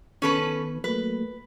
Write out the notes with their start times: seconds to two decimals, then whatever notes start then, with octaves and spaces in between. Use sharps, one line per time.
0.22 D#3 B3 C#4 A4 B4
0.84 F#3 A3 A#3 B4